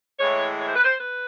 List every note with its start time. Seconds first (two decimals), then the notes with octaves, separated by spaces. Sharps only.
0.19 A2 E3 G#3 C#5
0.59 C#5
0.67 C5
0.75 B4
0.83 C5
0.99 B4